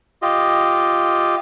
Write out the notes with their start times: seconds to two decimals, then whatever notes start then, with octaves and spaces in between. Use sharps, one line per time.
0.22 F4 G4 D#5